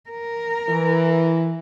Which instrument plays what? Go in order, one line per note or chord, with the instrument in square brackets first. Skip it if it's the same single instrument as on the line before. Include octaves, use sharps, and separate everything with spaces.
[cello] A#4
[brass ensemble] E3